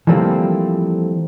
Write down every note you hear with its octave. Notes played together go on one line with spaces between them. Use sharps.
E3 F3 G3 A3 A#3 C4